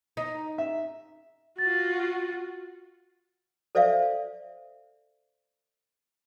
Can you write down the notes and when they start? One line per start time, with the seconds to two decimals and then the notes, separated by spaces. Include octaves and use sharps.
0.17 D#4
0.58 E5
1.58 F4 F#4 A6
3.75 A4 C5 D5 E5 F5